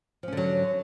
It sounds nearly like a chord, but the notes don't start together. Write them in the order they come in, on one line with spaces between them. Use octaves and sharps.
F3 C#4 D3 F#3